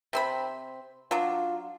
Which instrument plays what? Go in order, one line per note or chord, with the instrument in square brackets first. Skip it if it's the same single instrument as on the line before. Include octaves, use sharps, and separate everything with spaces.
[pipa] C3 C4 B5
[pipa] F#3 D4 [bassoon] F4